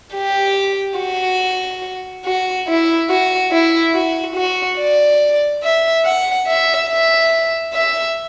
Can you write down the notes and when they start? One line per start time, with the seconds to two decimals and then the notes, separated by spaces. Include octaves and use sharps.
0.15 G4
0.99 F#4
2.25 F#4
2.68 E4
3.10 F#4
3.51 E4
3.95 F#4
4.36 F#4
4.78 D5
5.63 E5
6.05 F#5
6.47 E5
6.89 E5
7.74 E5